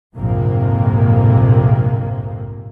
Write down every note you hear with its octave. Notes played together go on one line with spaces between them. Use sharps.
A#1 F2 G#2 C3 A#3